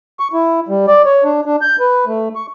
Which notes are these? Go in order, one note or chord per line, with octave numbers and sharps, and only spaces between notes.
C#6
E4
G3
D5
C#5
D4
D4
G6
B4
A3
C#6